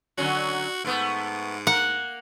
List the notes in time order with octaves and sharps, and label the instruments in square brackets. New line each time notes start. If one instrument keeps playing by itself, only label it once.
[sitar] D3 F#3 C#4 [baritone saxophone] F#4
[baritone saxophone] G#2 [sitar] A3 B3
[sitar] A#3 A#4 [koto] F#5